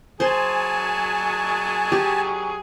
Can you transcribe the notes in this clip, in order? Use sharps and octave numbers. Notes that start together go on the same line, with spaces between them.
F#3 G#4 C5 G#5 A5
G4